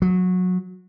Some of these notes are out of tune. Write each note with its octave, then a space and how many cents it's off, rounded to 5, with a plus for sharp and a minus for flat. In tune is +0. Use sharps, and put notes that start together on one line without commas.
F#3 -20